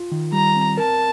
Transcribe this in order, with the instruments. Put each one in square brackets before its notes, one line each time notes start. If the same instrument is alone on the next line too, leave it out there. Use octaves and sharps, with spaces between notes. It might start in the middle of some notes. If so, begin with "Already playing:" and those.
Already playing: [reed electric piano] F4
D#3
[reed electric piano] G3 [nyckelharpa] A#5
[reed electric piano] C4
[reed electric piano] A#4 [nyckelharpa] A5